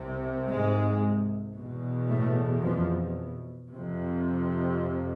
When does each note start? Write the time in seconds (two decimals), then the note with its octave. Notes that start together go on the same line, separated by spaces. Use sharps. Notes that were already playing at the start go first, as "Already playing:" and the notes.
Already playing: C2 C3
0.48 G#2 G#3
1.55 E2 B2
2.09 A2 A3
2.63 F2 F3
3.70 F2 C3